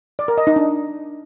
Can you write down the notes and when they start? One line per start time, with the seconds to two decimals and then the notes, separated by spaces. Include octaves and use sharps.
0.19 D5
0.28 A#4
0.38 D#5
0.47 D#4
0.56 D4